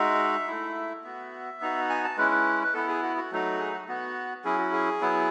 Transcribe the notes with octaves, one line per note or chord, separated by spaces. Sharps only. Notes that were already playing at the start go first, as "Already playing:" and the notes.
Already playing: G#3 D#4 F#4 E5
A3 E4
B3 F#4 E5
B3 D#4 F#4
G#5
A5
G#3 C#4 E4 B4
B4
B4
B3 E4 A4
G#4
F#4
F#4
F#3 A3 D#4 F#4
G#4
F#4
B3 F#4
F#3 C#4 E4 G#4
F#4
G#4
F#3 B3 E4